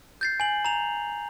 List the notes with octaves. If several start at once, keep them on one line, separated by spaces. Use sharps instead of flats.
G6 A6 C7
G#5 F#7
A#5 F7